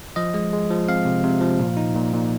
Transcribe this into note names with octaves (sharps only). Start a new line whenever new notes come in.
F3 D#5
G#3
G#3
F3
C4 F5
C3
C3
F3
A#2
D#4
A#2
A#2